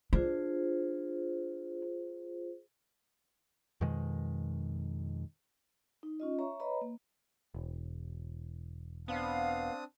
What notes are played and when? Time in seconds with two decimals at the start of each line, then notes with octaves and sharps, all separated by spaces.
0.13 D4 F4 G#4 C5
3.81 F2 B2 D#3 G#3
6.03 D#4
6.20 C#4 F4 D#5
6.39 C#5 E5 A#5 C#6
6.60 B4 C#5 D#5 A#5 B5
6.81 A#3
7.54 E1
9.08 B3 C4 D4 F5 D#6